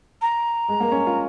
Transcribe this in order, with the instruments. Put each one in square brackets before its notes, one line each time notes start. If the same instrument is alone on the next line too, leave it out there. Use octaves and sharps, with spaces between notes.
[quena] A#5
[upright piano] G#3
A#3
C#4
F4